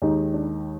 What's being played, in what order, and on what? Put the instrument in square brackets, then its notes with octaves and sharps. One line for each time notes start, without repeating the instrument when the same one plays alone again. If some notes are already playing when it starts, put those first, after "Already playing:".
[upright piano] D#2 D#3 G#3 D#4
D4